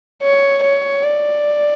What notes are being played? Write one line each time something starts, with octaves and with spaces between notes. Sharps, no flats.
C#5
C#5
D5